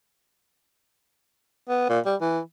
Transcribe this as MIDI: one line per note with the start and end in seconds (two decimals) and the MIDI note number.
1.69 1.86 59
1.89 2.00 46
2.06 2.15 55
2.21 2.40 52